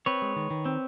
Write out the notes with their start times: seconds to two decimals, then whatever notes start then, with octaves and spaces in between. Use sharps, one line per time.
0.06 C4 B4 C#5
0.22 G#3
0.36 D#3
0.50 D#3
0.66 C4